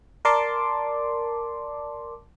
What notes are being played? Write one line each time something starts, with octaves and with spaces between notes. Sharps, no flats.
A#4 D5 A5 C6 D6